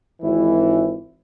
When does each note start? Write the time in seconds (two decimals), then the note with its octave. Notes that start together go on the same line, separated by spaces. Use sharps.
0.22 G#1 E3 E4